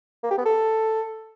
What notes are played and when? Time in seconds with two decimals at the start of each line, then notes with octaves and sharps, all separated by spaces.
0.23 A#3
0.31 G4
0.38 B3
0.46 A4